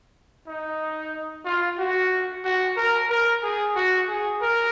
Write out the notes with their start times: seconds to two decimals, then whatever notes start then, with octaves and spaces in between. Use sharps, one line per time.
0.47 D#4
1.45 F4
1.78 F#4
2.44 F#4
2.76 A#4
3.09 A#4
3.43 G#4
3.75 F#4
4.08 G#4
4.42 A#4